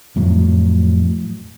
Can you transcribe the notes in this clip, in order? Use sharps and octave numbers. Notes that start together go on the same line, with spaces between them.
F2 A2 F#3